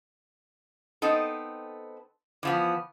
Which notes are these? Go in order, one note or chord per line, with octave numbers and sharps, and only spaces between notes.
B3 C4 D#4 A4
E3 F3 B3